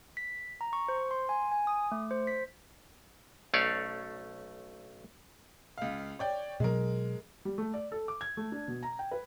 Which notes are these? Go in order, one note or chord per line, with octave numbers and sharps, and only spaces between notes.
B6
A#5
C#6
C5
C6
G#5
G#5
D#6
A3
C5
B6
B1 A3 C#4 C#5 D5 F5
C#2 F5
C#5 D5 G5
B2 F#3 G#3 A#4
G3
A3
D5
A4
D6
G#6
A3
D4
B2
A#5
G5
B4